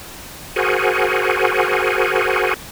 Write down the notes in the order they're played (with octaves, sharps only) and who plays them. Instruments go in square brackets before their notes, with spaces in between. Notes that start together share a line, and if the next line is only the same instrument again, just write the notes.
[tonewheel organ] F#4 G#4 A#4 C5 F#5 G#5